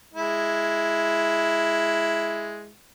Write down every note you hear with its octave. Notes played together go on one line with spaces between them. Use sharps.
G#3 E4